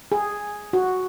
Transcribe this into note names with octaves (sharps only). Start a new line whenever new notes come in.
G#4
F#4